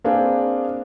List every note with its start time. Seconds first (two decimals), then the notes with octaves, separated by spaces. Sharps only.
0.04 A#3 C4 D4 G#4 B4 F5